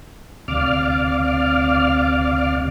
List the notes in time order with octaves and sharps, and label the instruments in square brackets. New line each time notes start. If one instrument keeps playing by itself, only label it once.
[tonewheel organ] D2 C3 D5 F5 D6 F6